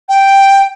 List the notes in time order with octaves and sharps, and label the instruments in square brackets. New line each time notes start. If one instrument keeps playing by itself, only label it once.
[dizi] G5